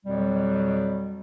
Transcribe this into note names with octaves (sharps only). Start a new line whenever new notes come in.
F2 B2 F#3 G3